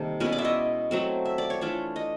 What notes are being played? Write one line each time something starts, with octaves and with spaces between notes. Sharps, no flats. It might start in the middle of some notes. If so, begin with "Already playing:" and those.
Already playing: C3 D#3 G3 A#3 A4
B2 G#3 C#4 E4 B4
D5
E5
D#5
F#3 A3 C4
E5
D5
C#5
E3 A3 D4 F4 C#5
D#5